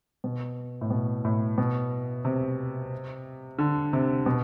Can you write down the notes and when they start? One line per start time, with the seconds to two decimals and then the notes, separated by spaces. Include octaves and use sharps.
0.24 B2
0.81 A2
0.90 B2
1.25 A2
1.58 B2
2.25 C3
3.59 D3
3.93 C3
4.26 B2